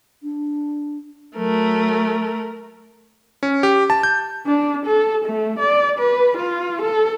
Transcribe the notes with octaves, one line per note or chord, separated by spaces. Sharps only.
D4
F#3 A3 A#4
C#4
G4
A5
G6
D4
A4
A3
D5
B4
F4
A4